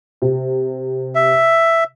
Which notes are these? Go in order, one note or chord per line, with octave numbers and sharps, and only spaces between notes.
C3
E5